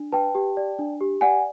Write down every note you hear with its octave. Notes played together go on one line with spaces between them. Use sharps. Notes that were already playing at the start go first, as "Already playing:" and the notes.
Already playing: D4
B4 G5 A5
G4
D5
D4
G4
D5 F#5 G#5